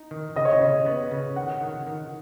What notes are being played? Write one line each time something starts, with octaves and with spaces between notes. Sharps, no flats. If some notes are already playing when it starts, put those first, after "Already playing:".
Already playing: D#4
D#3
C#3 D#5
C#5
D#5
C#3
B3
C#3
D#3 F#5
D#3
D#3